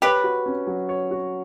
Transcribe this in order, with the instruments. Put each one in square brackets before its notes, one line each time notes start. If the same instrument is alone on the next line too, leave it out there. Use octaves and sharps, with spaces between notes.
[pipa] G4 B4 [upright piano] C#5
[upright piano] F#4
C#4
F#3
C#5
F#4